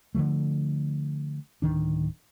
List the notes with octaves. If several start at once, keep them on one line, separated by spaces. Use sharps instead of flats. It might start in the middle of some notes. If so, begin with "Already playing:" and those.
D3 E3 F3 A3
D1 C2 D#3 D4